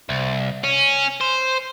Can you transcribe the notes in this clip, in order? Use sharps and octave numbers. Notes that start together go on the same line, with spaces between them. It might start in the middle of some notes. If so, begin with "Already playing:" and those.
C2
C#4
C5